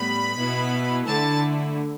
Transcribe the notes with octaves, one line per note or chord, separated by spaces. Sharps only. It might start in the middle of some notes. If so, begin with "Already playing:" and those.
Already playing: A2 G3 B3 B5
B2 B3 E4
D3 A3 E4 A5